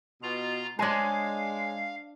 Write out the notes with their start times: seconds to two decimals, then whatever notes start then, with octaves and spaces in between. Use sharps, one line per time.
0.23 B2 F4 A#5
0.79 G#3 D4 C5 C#5 D#5 F5 G#5